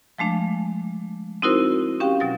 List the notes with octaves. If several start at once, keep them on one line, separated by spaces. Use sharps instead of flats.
F3 G#3 A3 D4
C4 D#4 E4 F#4 A#4 C5
C#4 G4 F5 G5
B2 F#3 A6